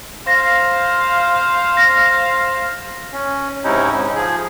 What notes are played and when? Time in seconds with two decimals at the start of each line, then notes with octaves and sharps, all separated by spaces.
0.27 C5 F5 A#6
1.77 A#6
3.13 C#4
3.64 G#2 C3 C#4 D#4 E4
3.95 G#2
4.16 F3 G#4